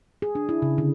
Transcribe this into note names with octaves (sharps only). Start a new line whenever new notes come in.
G#4
D4
E4
C#3
D3